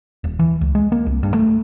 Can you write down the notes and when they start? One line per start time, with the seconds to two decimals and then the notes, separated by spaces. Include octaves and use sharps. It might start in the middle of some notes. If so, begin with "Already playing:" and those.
0.24 D#1
0.39 E3
0.61 C#2
0.75 G#3
0.92 A#3
1.06 C2
1.23 G2
1.34 A3